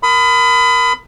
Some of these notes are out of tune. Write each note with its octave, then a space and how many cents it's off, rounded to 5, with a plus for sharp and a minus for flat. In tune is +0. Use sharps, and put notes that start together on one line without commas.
A#4 +0 B5 +30 D#6 +5